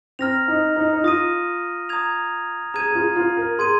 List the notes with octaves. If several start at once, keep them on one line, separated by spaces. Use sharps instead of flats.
C4 A#5 F6 A#6 F7
D#4
D#4
D#4
F4 D#6 A#6 D#7
A#5 D#6 G#6 F7
G#4 A#5 G#6 D#7
G#4
F4
F4
A#4
G#4 C6 G#6 D#7